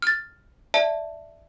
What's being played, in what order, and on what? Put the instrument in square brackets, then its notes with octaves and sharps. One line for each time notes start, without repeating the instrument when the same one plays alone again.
[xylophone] F6 A6
D5 E5 A5